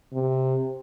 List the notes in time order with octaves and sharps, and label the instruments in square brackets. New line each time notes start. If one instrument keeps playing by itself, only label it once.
[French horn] C3